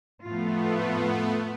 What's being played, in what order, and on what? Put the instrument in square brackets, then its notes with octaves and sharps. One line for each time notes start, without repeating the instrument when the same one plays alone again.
[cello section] F2 A2 F4 [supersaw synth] A3 B3